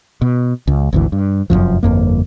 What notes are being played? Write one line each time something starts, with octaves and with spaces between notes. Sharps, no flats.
B2
C#2
G#1 D2 E3
G2
F1 C2 F#2 F3
G1 F2 A#3